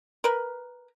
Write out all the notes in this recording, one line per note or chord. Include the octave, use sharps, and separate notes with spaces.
A#4 B4